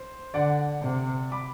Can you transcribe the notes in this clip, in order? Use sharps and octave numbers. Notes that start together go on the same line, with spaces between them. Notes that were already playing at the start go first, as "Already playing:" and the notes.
Already playing: C5
D3 D5 F#5
C3
B5 D6